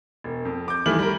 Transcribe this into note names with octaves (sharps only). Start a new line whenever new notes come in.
E1
F2
D6 G6
D#3 E3 G3 A3 F6 F#7
G3 A#4